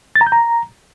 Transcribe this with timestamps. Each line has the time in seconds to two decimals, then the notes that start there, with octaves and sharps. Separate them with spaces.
0.16 A6
0.21 A#5
0.27 G6
0.32 A#5